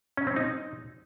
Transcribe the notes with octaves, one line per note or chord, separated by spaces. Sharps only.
C#4
C4
D#4